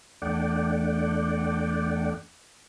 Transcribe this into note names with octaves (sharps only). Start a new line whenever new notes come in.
E2 A3 D4 D5 F#5 G5